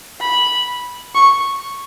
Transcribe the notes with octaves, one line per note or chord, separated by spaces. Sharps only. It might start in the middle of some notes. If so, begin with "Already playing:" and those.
B5
C#6